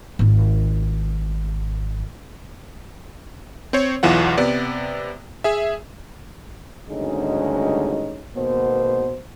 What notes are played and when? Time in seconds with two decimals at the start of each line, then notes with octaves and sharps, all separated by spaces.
0.19 G#1 F4
3.73 C4 C5 C#5
4.03 B1 E2 E3 F4 F#5
4.38 C3 B3 D5
5.44 G#4 E5
6.89 G#1 D2 G2 G#3 C#4 D#4
8.36 G#1 B2 A#3 B3 C5